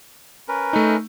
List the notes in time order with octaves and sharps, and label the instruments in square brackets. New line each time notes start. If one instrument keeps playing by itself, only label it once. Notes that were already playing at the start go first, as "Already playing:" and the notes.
[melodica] C#4 A#4 B4
[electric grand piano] A3 D#4